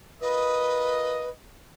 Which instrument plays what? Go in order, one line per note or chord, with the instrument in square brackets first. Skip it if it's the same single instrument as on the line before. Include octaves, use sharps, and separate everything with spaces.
[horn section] F4 A#4 D#5 [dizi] B4